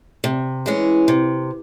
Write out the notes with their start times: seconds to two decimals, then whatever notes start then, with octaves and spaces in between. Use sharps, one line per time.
0.24 C3
0.66 E3 G#3 C#4
1.08 C3